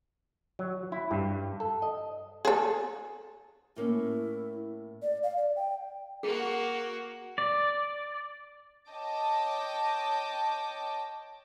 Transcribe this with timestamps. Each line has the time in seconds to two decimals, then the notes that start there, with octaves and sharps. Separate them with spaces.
0.59 F#3
0.92 E4
1.11 G2
1.60 A4
1.82 D#5
2.45 G#4 A4
3.76 A2 A#3 C#4 E4
5.02 D5
5.23 F5
5.37 D5
5.56 G5
6.23 A#3 F#4 G#4
7.38 D5
8.90 C#5 D#5 G5 A5 D6